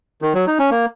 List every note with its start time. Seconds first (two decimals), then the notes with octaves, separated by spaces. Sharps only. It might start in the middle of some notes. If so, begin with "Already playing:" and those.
0.22 D#3
0.35 F#3
0.47 D#4
0.59 C#4
0.71 A#3